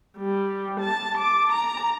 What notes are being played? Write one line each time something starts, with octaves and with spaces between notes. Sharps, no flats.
G3
A5
D6
A#5